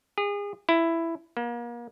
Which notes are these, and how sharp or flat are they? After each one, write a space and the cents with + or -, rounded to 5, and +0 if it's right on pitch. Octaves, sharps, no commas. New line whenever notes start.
G#4 -35
E4 +10
A#3 +35